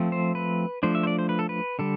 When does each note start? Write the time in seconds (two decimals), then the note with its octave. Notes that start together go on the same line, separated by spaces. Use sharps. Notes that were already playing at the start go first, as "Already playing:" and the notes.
Already playing: F3 A3 C4
0.12 C5
0.35 B4
0.83 F3 A3 D4 C5
0.95 E5
1.03 C5
1.07 D5
1.19 C5
1.29 B4
1.39 A4
1.49 B4
1.79 D3 G3 A4